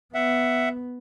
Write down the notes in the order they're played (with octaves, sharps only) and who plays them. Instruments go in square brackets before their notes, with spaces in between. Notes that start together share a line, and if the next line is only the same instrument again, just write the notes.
[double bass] B3 [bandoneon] E5 F#5